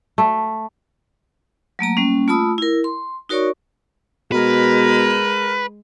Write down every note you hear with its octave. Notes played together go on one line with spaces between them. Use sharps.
A3
F#3 A3 A#3 A#5
G3 A#3 C#4
A3 F4 A5 B5 D#6 E6
E4 A#4
C6
D#4 F#4 A#4 C#5 D5 C#6
B2 G#3 A#4 B4